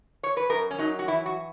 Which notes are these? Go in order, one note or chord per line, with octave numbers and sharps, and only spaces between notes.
C#5
B4
F#2 A#4
C#4
F#3 D#4
F#4
E3 E4
F#4